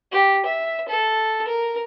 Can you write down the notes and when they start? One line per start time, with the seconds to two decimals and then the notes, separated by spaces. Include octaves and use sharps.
0.12 G4
0.45 E5
0.88 A4
1.48 A#4